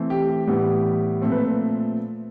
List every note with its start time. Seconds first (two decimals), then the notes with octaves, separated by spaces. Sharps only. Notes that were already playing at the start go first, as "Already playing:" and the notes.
Already playing: E3 A3 C4
0.10 G4
0.28 G4
0.47 A2 E3 G3 B3
1.22 A#2 F3 A3 C4
1.32 B4